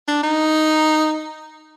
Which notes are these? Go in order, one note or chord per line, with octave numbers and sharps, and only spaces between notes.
D4
D#4